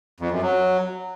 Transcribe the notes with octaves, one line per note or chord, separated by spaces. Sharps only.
F2
F#2
F#3